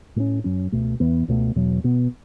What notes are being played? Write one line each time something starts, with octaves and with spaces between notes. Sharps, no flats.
A2 A3 C#4
F#2 F#3 C#4
C#2 B2 A3
E2 E3 B3
C#2 B2 A3
E2 B2 F#3
B2 B3